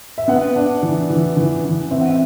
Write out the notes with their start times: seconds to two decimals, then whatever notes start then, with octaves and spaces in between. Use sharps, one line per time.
0.18 E5
0.28 B3 F#5
0.56 D4
0.83 E3
1.10 E3
1.37 E3
1.64 E3
1.91 C4 E5
2.01 F#5
2.10 E5